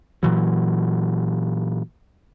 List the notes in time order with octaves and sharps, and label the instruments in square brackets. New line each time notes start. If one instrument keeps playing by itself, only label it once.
[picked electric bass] A#2 E3 F#3